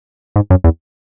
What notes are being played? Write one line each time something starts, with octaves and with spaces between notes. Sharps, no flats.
G#2
F#2
E2